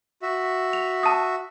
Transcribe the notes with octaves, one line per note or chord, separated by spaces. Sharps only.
F#4 E5
F7
A5 D#6